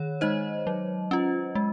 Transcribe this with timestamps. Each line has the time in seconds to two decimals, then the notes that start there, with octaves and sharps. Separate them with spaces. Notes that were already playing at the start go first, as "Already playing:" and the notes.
Already playing: D#3 C#5
0.21 G#3 D#4 C5 D#5
0.67 F#3
1.11 C#4 F4
1.55 G#3